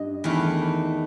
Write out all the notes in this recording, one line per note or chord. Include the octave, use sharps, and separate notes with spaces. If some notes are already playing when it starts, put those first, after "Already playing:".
Already playing: G2 D#5
E2 D#3 A3